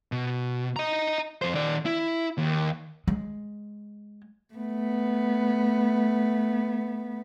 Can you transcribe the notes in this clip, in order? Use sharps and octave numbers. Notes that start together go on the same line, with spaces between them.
B2
D#5 A#5
F2 C5
D#3 D5
E4
D#2
G#3
A3 B3